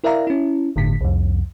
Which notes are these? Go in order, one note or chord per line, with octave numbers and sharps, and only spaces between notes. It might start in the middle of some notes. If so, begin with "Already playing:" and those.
E4 A#4 D5 E5 F5 A#5
C#4 E4
G1 A2 D3 B6
C2 F2